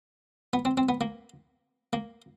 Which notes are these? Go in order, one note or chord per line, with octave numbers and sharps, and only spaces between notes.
B3
C4
C4
B3
A#3
A#3